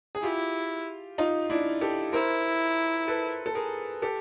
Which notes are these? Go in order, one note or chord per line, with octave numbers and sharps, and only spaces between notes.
G#4
E4 F4 G4
D#4 F4
D4 E4
G4 A4
E4 A#4 C5
A4 B4
A4
G#4 A#4
G4 A4